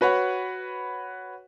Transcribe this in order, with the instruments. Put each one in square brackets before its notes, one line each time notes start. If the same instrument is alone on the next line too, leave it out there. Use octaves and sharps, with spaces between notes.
[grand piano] F#4 B4 C#5 F#5